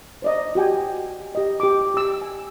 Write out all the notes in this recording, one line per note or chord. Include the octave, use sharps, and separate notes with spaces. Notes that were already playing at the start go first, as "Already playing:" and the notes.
C5 D5 D#5
F#4 G4 G5 G#5
G4 D#5
G4 D6
G4 E6
G#5